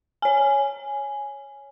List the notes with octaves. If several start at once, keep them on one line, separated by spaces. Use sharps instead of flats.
C#5 G#5